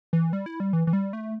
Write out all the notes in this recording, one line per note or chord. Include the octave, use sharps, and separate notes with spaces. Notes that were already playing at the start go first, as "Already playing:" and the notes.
E3
G3
E4
G3
E3
E3
G3
A3